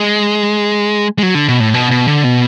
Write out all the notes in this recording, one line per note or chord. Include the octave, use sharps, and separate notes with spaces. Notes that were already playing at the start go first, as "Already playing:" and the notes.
Already playing: G#3
G#3
F#3
D3
B2
A2
B2
B2
D3
B2